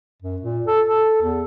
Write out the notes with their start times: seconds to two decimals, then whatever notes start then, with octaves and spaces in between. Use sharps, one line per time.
0.22 F#2
0.42 A#2
0.67 A4
0.87 A4
1.22 E2